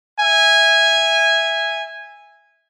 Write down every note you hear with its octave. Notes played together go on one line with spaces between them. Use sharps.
E5 G#5